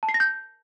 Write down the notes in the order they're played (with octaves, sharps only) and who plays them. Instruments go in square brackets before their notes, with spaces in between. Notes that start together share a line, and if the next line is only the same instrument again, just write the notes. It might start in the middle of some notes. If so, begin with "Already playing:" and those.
[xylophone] A5
C7
A#6
G6